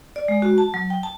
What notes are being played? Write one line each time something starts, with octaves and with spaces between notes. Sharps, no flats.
D5
G#3
F#4
A5
F#3
G5
A5